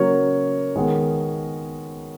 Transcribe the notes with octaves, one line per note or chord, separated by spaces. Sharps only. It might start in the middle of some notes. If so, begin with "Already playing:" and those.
Already playing: C#3 F#3 A#3 A#4 C#5
D#3 G#3 B3